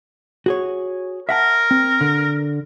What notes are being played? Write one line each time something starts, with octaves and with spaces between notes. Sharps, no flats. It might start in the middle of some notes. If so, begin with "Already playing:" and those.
F#4 G#4 C#5
A#4 E5 F#5 A5
C4
D3